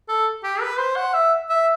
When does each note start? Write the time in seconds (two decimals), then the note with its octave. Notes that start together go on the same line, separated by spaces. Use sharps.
0.08 A4
0.43 G4
0.61 B4
0.79 C5
0.96 F#5
1.14 E5
1.49 E5